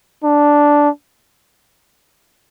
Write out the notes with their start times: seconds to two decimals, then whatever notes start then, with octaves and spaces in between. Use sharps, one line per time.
0.24 D4